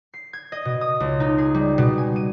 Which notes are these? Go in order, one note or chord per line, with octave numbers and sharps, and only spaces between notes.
C7
G#6
D#5
B2
D#6
C#2
D#4
G#4
G3
B2
G#5
D#7